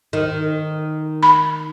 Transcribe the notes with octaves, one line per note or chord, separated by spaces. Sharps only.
D#3
B5